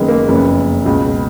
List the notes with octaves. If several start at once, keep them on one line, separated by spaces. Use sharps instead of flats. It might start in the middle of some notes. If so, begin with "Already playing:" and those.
Already playing: F#1 F#2 D#3 G#3 B3
A#3
F#1 F2 C#3 B3
C#2 B2